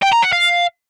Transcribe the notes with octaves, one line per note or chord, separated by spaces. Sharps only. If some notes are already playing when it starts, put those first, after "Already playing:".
G5
A#5
F#5
F5